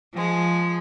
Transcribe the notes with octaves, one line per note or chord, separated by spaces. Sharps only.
F3 G#3